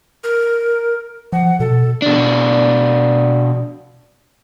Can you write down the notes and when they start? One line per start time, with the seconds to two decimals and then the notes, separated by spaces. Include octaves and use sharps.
0.24 A#4
1.33 F3 F#5
1.60 B2 A4
2.02 B2 D4